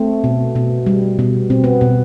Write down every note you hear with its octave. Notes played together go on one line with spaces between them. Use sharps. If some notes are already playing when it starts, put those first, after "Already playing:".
Already playing: A3 C4
B2
B2
G3
B2
B2 C4
B3
B2